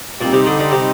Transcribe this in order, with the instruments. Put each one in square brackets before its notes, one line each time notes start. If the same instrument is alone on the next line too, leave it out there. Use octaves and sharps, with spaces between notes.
[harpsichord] A#2 [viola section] G3 C4 D#4 G4
[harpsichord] C3
D3
D3
C3